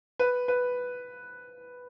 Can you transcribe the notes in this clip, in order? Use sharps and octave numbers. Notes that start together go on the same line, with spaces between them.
B4
B4